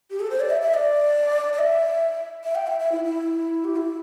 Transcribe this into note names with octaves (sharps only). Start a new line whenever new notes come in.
G4
A4
C5
D5
E5
E5
D5
D5
E5
E5
G5
E5
E5
E4
E4
G4
E4